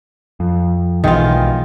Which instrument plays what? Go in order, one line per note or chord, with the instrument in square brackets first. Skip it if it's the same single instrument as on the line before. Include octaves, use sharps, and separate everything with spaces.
[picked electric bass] F2
[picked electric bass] B1 B2 E3 [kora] D#3 G#3 F4